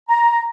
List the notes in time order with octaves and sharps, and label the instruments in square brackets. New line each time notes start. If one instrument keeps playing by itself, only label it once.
[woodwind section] A#5